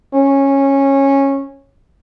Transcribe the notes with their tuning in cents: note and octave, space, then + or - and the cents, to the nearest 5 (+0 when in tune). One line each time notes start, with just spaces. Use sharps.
C#4 -15